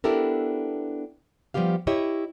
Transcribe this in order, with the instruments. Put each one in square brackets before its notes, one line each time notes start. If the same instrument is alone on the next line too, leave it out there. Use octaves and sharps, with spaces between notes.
[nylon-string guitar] B3 D4 E4 G4 A4 A#4
F3 G3 B3 G4 F5
E4 G4 C#5 D#5 E5